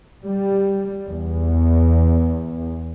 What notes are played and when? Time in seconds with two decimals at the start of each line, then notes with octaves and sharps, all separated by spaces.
0.24 G3
1.08 E2